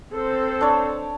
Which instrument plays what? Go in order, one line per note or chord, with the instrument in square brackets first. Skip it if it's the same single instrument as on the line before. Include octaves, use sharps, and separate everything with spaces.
[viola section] C4 A4 C5
[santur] D4 C#5